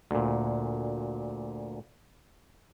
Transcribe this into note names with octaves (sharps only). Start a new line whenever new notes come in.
D2 A#2